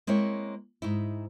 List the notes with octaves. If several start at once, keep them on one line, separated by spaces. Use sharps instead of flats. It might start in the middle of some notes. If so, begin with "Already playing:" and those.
G#3 A#3 C4 E4 C5 C#5
G#2 D#4 E4